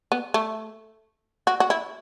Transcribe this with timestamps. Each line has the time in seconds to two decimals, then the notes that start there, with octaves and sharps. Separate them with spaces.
0.12 B3
0.34 A3
1.47 F#4
1.60 F#4
1.70 E4